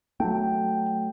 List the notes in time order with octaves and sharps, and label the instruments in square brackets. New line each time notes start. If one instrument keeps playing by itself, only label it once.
[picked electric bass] F#3 A3 [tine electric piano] G5